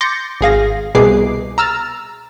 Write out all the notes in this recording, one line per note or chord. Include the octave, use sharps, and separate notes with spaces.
C6 D6 G6 A6 A#6 C#7
G#1 G#4 F5 A#6
C2 B2 G#4 B4 D6 C7
A#5 E6 F6 A6